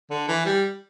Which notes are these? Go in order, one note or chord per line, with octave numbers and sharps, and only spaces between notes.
D3
E3
G3